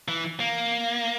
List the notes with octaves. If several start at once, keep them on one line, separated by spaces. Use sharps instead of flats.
E3
A#3